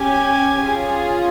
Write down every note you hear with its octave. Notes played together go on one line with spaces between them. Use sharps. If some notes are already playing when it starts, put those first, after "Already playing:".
Already playing: C#4 G4 G#5
C#4 F4 G#4